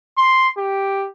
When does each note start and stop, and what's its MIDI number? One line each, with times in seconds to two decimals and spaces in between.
0.18 0.48 84
0.58 1.07 67